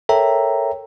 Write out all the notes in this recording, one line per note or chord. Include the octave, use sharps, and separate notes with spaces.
A4 A#4 C#5 E5 G5 A#5